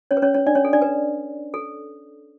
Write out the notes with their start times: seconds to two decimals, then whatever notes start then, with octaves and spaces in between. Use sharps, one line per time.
0.11 C#4 C#5
0.17 B4
0.22 C#4 C#5
0.34 C#4 C#5
0.47 D4 D5
0.55 C#4 C#5
0.65 A4
0.73 D4 D5
0.82 B4
1.54 A4